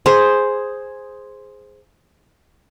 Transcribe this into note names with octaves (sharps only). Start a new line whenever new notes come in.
G#4 C5